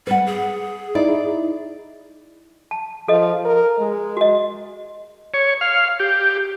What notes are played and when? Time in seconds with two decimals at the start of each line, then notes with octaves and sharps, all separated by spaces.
0.07 G3 B4 F#5
0.26 G#4
0.95 D#4 E4 D5
2.71 A5
3.08 F3 A4 D#5
3.45 A#4
3.79 G#3
4.17 F#4 D#5
5.34 C#5
5.61 F5
6.00 G4